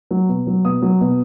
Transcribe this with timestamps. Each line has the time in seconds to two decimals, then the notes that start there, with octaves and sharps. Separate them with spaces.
0.11 F#3
0.29 B2
0.47 F#3
0.65 B2 D#6
0.82 F#3
1.01 B2